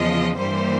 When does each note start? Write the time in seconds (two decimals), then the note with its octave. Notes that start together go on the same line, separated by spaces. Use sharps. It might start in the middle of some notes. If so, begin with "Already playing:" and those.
Already playing: E2 C#3 F3 G#3 D#5
0.36 G2 E3 G3 A#3 C5